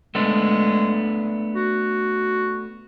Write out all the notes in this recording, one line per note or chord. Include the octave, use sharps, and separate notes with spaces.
G#3 A3 B3 D4
F#4